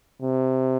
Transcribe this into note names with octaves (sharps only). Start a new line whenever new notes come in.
C3